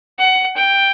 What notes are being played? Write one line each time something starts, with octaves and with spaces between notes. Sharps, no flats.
F#5
G5